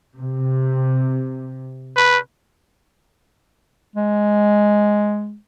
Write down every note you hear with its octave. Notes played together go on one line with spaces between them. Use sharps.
C3
B4
G#3